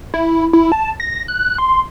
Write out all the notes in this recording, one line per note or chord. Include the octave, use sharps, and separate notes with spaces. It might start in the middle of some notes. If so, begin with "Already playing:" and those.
E4
E4
A5
A#6
F#6
C6